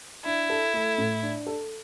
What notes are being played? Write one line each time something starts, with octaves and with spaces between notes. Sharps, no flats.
D4 E4
A4
A3
A2
D4
A4